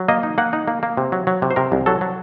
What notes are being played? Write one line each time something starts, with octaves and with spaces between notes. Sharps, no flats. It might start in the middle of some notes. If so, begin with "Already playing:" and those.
Already playing: F#3
A#3 D#5
D#4
A#3 F#5
D#4
A#3
A#3
C3
F#3
F#3
C3
C5
C3 A#4
C2
F#3 A4
F#3